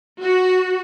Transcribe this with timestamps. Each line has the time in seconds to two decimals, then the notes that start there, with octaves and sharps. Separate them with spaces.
0.21 F#4